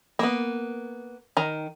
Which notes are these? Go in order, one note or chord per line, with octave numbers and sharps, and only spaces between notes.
A#3 B3
D#3 A#5